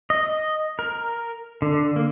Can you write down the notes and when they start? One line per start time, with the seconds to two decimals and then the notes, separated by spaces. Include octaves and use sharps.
0.10 D#5
0.79 A#4
1.62 D3
1.96 A#3